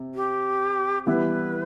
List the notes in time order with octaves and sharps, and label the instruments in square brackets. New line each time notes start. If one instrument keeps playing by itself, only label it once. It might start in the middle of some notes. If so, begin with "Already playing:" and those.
Already playing: [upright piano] C3
[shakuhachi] G4
[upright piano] E3 G3 B3 E4 [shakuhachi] B4